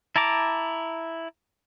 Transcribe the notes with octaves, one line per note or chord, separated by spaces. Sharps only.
E4 A5 A#5 D6